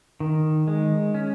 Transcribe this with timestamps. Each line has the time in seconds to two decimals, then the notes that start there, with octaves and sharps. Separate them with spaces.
0.20 D#3
0.68 G#3
1.14 C#4